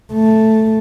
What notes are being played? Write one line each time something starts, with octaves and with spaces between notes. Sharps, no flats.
A3